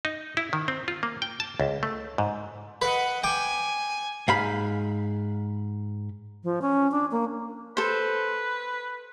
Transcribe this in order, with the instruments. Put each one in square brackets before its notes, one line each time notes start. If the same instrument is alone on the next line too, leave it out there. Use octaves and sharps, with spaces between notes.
[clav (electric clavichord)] D#4
E4
D#3
C4
F4
A#3
G5
A5
C#2
A3
G#2
[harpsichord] B4 [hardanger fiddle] D#5 F#5
[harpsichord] G5 D6 [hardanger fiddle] G#5
[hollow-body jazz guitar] G#2 F5 B5
[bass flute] F3
C#4
D4
A#3
[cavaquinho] A4 C5 [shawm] B4